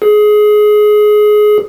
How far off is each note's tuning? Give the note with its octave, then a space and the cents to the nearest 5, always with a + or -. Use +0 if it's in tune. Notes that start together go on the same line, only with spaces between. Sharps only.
G#4 +20